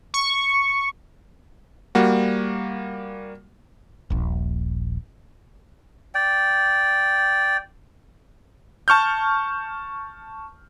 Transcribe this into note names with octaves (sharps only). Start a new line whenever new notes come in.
C#6
G3 A#3 F#4
D#1 A#1
D5 G5
A5 C#6 F6 G6